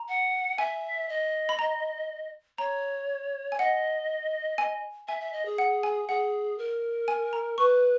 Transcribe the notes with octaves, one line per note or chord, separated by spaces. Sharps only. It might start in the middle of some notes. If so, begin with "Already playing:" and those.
Already playing: A#5
F#5
E5 G#5
D#5
B5
A#5
C#5 A#5
G#5
D#5 F#5
G#5
E5 G#5
E5
D#5
G#4
F#5
G#5
G#4 F#5
A#4
G#5
A#5
B4 C#6